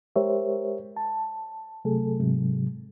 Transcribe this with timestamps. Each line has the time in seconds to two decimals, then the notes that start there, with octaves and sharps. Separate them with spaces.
0.16 G#3 G4 A#4 C5 C#5 E5
0.97 A5
1.85 C3 F#3 A3 G#4 A4
2.20 G#2 C3 F#3 G#3